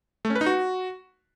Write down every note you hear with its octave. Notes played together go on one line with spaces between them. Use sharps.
A3
C#4
B4
D#4
F#4